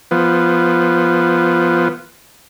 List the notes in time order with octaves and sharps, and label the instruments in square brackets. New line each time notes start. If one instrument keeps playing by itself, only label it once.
[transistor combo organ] F3 B3